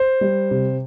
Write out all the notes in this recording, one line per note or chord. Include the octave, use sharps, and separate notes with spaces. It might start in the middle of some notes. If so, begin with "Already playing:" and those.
Already playing: C5
G3
C3